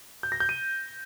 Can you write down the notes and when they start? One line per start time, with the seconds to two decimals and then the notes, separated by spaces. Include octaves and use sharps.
0.23 G6
0.32 A#6
0.40 G6
0.49 D#7